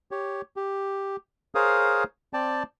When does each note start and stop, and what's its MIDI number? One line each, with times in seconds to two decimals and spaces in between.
0.11 0.41 67
0.11 0.41 73
0.56 1.16 67
1.55 2.04 68
1.55 2.04 70
1.55 2.04 72
1.55 2.04 73
1.55 2.04 77
1.55 2.04 87
2.33 2.63 60
2.33 2.63 74
2.33 2.63 79
2.33 2.63 81